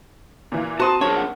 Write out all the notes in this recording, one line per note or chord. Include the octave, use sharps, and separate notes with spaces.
A#2 E3 A#3
C4 F#4 A5 A#5 C6 D#6 D#7
D4 G#4 A#4 C#5 A5
F#5